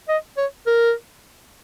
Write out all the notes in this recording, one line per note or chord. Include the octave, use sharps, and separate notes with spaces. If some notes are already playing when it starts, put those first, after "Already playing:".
D#5
C#5
A#4